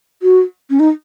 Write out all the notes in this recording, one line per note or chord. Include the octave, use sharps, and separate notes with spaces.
F#4
C#4
D#4